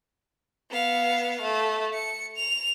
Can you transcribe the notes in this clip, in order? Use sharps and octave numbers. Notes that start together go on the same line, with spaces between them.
B3 F5
A3
C#7
F7